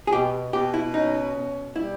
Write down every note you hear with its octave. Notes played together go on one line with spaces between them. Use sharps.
G#4
B2 G4
B2 G4
E4
C#4 D#4
B2
G3 E4